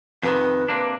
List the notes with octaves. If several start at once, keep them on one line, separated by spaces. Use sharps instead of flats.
F2 C3 D#3 B4
C3 A#3 D4